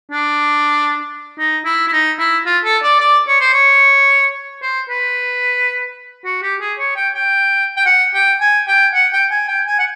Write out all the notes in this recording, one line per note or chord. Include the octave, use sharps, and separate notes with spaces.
D4
D#4
E4
E4
D#4
E4
F4
A4
D5
D5
C#5
C5
C#5
C5
B4
F#4
G4
G#4
C#5
G5
G5
G5
F#5
G5
G#5
G5
F#5
G5
G#5
G5
G#5
F#5